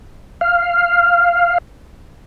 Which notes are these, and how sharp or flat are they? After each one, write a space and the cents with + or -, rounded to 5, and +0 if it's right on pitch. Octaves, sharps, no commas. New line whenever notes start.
F5 -5